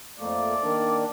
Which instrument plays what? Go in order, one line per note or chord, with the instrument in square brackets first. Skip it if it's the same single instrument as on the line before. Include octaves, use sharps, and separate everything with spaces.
[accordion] F2 A3 A#3 [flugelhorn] D5
[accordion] D#3 A#3 D4